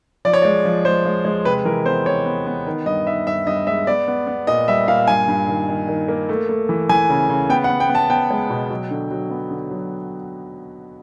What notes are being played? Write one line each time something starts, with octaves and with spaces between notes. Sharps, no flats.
F3 D5
C#5
G#3 D5
F3
G#3 C5
G#3
G#3
C3 B4
E3 A#4
B3 C5
C3 C#5
B3
B3
D#3
G2 D#5
D#3 E5
G2 E5
G2 D#5
G#3 E5
B3 D5
B3
B3
A#2 D#5
G3 E5
A#2 F5
G2 G#5
G2
D#3
D#3
D#3
A#3
A3
A3
E3
E3 G#5
C#3
C#3
B3 G5
F#5
B3
G5
B3
A5
B3 G5
G#3
B2
F#3
D3
F#3
B3
D3
F#3